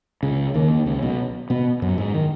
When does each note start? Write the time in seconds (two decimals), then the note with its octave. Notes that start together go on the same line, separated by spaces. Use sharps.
0.23 C#2 C#3
0.54 D#2 D#3
0.86 C#2 C#3
1.02 B1 B2
1.50 B2 B3
1.82 F#2 F#3
1.98 G#2 G#3
2.14 D#3